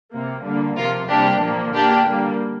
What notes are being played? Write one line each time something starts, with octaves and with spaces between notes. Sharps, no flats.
C3 A#3
D3 G3 A#3
C3 F3 A#3 F4 A#4
C3 G3 A#3 D4 G4
A#2 F3 A#3
D3 A#3 D4 G4
D3 G3 A#3